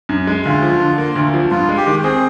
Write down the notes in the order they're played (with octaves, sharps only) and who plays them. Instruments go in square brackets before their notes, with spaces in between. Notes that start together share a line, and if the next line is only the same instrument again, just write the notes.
[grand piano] F#2
G#3
[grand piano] D2 [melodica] F4
[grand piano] F3
D3
A#3
D2
F3
[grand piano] G2 [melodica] F4
[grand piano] G#3
[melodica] G4
[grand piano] D#3
[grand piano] C4 [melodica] G#4